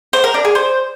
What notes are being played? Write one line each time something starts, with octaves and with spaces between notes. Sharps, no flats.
C5
A#4
D4
G#4
C5